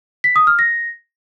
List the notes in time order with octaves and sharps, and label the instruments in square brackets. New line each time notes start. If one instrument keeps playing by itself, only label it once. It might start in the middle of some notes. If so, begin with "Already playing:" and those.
[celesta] B6
D#6
F6
A#6